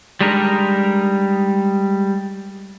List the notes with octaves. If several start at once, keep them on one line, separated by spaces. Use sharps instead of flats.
G3 G#3 D4 D#4 A#4